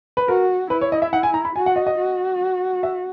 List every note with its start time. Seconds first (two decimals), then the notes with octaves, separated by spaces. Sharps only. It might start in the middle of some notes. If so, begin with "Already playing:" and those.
0.17 B4
0.28 F#4 A#4
0.70 E4 B4
0.81 C#5
0.92 D#5
1.02 E5
1.13 F#5
1.23 G#5
1.34 A#5
1.45 B5
1.56 F#4 G#5
1.66 F#5
1.76 D#5
1.87 D#5
1.98 F#4
2.83 E5